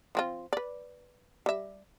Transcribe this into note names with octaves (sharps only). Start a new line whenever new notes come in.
F3 C4 F4
B4 D5
G3 E5